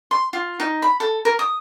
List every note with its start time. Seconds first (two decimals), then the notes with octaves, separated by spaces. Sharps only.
0.11 C6
0.33 F4
0.60 D#4
0.82 B5
1.00 A4
1.25 A#4
1.39 D#6